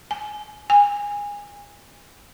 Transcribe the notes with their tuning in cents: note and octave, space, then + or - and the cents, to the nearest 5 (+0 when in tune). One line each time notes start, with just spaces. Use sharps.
G#5 +20
G#5 -20